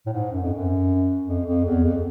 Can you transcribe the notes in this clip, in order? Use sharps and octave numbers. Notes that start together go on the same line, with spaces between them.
A2
G#2
F#2
F2
F#2
F2
F2
E2
F2